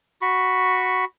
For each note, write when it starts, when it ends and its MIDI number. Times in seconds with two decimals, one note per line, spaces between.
0.22 1.05 66
0.22 1.05 83
0.22 1.05 85